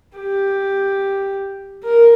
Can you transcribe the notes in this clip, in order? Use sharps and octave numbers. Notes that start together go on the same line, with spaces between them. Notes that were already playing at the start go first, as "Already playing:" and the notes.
G4
A#4